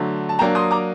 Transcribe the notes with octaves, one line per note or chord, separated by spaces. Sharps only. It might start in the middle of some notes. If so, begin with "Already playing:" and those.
Already playing: D3 F#3 A3
A5
F#3 A#3 D4 G5 A#5
C6 D#6
A#5 D6